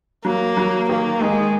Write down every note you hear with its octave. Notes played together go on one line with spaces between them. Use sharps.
F#3 A#3
F#3
D#3 A#3
D#3 G#3